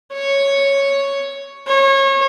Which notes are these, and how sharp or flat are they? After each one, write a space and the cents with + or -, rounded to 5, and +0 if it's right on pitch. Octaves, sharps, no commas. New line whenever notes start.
C#5 +0
C#5 -30